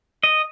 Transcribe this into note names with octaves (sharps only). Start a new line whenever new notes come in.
D#5